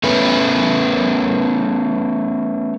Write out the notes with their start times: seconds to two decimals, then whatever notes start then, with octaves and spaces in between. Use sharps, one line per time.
0.04 A3 B3 C#4 B4